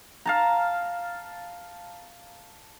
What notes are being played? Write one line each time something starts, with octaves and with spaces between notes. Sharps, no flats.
F5 A5 A#5